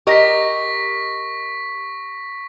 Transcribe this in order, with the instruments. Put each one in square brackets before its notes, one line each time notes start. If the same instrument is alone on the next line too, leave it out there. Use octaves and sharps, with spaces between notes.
[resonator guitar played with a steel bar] G4 A#4 D#5 [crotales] C#6 A#6 B6